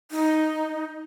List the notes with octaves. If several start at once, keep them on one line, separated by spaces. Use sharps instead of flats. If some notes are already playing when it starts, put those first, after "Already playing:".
D#4